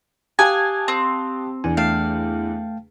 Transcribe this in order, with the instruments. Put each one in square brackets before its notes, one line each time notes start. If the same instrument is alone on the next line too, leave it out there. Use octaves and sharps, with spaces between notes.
[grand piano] G4 F5 A5 [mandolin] G#5 [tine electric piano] D6 D#6 F#6
[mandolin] C4
[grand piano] E2 D4 [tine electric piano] G#5
[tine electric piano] A3 G5 A5 [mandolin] F5